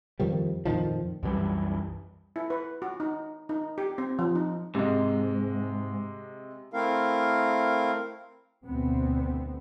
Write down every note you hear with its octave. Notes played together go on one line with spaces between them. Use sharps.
F2 D#3 F3 G3
F2 A#2 D#3 F3
C2 F#2 E3 G3
E4
B4
F#4
D#4
D#4
G4
C4
F3
D#4
G#2 C3 G#3
A3 C4 E4 A#4 F5
D2 B2 B3 C4